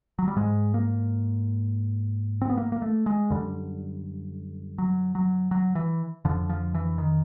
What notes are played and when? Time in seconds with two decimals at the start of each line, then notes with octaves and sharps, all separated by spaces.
0.19 F#3
0.28 G3
0.36 G#2 G#3
0.74 A#3
2.42 C4
2.50 B3
2.58 A#3
2.72 A#3
2.82 A3
3.06 G#3
3.30 F#2 D3 G3
4.78 F#3
5.15 F#3
5.51 F#3
5.75 E3
6.25 F2 D3 F3
6.49 F3
6.75 E3
6.98 D#3